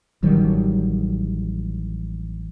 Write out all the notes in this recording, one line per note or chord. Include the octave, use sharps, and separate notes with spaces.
A1 D#3 F#3 G3